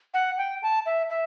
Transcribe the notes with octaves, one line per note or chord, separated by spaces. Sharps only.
F#5
G5
A5
E5
E5